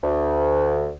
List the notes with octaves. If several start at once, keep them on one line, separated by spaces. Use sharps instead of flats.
D2